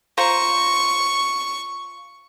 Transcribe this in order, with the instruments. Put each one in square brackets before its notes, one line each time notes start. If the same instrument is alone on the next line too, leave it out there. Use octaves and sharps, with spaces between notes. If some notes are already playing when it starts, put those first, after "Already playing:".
[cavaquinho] F4 C5 A#5 [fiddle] C#6